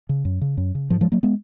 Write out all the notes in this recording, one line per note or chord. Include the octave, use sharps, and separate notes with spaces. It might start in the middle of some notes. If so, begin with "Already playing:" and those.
C#3
F#2
C#3
F#2
C#3
G#2 F3
F3 G#3
F#3 A#3
G#3 B3